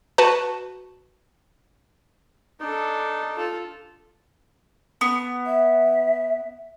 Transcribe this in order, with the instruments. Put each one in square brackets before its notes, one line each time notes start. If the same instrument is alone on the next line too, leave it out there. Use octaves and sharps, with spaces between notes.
[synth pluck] F#4 B4 A5
[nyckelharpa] D4 A4 [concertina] D#4
[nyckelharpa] F4 A4
[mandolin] B3
[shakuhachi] E5